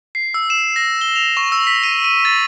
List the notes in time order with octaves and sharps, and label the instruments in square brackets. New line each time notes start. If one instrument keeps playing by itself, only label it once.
[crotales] C7
E6
E7
A#6
G7
F7
C#6
E6
B6
D#7
D#7
A6